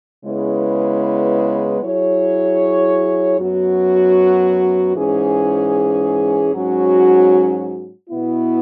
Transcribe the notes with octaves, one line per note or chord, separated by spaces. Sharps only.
C#3 G#3 B3 E4 B4
F#3 E4 G#4 C#5
F#2 F#3 B3 F#4
G#2 E3 C#4 G#4
G#2 F#3 C#4 F#4
B2 B3 E4